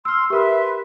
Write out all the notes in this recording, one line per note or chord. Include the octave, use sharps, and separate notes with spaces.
C6 E6 F6
G4 A#4 B4 E5 C6